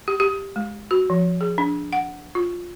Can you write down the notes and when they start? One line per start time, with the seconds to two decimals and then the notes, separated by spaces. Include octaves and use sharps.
0.08 G4
0.20 G4
0.56 G#3
0.91 F#4
1.10 F3
1.41 G#4
1.58 D4
1.93 F#5
2.35 F4